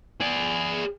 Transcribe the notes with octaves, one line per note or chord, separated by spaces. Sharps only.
G#4 D5